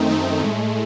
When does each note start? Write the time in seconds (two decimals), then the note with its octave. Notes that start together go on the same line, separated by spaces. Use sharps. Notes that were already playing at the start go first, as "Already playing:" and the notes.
Already playing: F#2 D#3 A3 C4 D#4
0.11 A3
0.40 A2 G#3